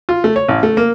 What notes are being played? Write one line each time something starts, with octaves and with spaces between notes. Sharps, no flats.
F4
A3
C#5
A1
A3
A#3